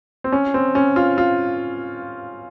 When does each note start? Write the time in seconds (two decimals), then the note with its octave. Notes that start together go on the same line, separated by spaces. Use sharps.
0.24 C4
0.32 C#4
0.54 C4
0.75 C#4
0.96 F4
1.18 F4